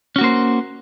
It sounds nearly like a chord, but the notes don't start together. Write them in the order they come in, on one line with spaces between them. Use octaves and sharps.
C#4 F#4 A#3 C5